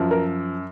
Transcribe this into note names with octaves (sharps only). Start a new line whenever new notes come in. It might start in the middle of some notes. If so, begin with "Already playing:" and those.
Already playing: F#2 F3
A#4